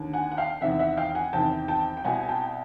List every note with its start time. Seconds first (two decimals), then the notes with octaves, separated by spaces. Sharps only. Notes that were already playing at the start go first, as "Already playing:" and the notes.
Already playing: D#2 D3
0.13 F#5 G#5
0.32 F#5
0.37 F5 G5
0.61 E2 C3 D#3 E5 F#5
0.79 E5 F#5
0.97 F5 G5
1.15 F#5 G#5
1.33 E2 C3 D#3 G5 A5
1.68 G5 A5
1.97 G5
2.04 C2 B2 F#5 G#5
2.23 G#5
2.28 G5 A5